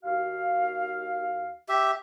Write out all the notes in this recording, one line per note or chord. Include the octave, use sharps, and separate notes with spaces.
D#2 F#4 F5
G4 E5